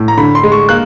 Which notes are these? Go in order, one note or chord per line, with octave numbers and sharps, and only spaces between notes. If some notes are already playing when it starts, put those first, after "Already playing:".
Already playing: A2
A#5
D3 B5
C6
G#3
C#6
A#3 F#6